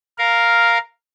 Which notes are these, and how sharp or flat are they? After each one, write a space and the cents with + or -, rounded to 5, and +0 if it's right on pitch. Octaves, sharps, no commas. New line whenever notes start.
A#4 +0 F5 +0